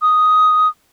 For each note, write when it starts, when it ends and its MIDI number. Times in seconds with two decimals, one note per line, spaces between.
0.02 0.68 87